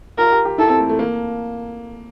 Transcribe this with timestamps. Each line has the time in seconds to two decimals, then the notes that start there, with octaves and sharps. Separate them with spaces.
0.18 F4 A#4
0.32 G4
0.45 G4
0.58 E4 A4
0.69 C4
0.79 A3
0.89 A3
0.99 A#3